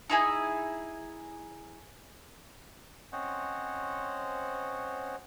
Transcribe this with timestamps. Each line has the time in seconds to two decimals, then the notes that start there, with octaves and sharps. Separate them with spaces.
0.09 D#4 E4 G#4
3.13 C4 C#4 C5 C#5 D#5 F#5